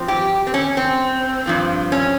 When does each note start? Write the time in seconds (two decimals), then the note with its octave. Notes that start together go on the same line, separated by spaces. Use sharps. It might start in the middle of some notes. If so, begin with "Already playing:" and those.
Already playing: G2 F3 C4
0.08 G4
0.47 C4
0.54 C#4
0.77 C4
1.46 G2 F3 C4
1.92 C#4